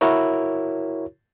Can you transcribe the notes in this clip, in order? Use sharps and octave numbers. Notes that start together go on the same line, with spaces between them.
E4 F#4 A#4 C#5